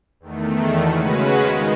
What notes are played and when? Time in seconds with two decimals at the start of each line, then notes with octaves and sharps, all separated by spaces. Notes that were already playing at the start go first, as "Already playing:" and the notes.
0.20 E2 D#3 A3
0.82 C#3 G#3 C#4 F#4 B4
1.43 D#3 G#3 B3 D#4